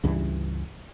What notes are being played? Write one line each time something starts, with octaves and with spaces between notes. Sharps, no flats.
C#2 G2 E3